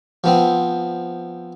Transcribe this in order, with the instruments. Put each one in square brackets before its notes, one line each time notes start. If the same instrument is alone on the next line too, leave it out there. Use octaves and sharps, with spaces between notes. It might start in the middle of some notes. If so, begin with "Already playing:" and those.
[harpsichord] F3 B3 C4